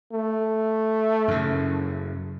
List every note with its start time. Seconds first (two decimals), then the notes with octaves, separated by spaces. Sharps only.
0.12 A3
1.28 F#2 C#3